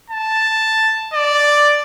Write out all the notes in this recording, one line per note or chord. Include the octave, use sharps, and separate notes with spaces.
A5
D5